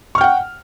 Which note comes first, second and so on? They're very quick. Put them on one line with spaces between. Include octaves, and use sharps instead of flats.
C#6 F6 G5 F#5